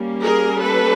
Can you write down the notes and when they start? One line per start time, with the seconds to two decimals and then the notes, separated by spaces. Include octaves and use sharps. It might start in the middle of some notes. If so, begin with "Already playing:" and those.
Already playing: G3 A#3 C#4
0.21 G#4 A#4
0.60 A4 B4